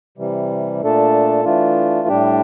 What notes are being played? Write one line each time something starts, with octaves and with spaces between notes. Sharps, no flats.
C3 E3 G3
A#2 A3 D4 A4
E3 A3 D4 F4
A2 G3 D4 G4